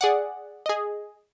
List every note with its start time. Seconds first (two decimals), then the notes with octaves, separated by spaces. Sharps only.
0.01 G#4 D5 F#5
0.66 G#4 D#5